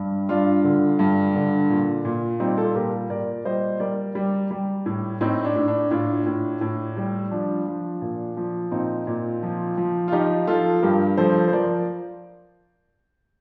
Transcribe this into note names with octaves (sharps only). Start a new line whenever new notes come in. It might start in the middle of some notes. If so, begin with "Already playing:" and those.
Already playing: G2 G3
G2 D4 F4
D3
G2
D3
A#2
A#2
G3 C4 D#4
F4 A4
A#2 G4 A#4
A#2 A#4 D5
G3 C5 D#5
G3 A#4 D5
G3
G3
A2
A2 C4 D#4
D4
A2
D4
A2 D4 F4
A2
A2
G3
F3 D4
F3
A#2
F3
A#2 C4 D#4
A#2
F3
F3
F4
F3 D#4 G4
F3 F4 A4
G2 G4 A#4
F3 A4 C5
C5
F3 A#4 D5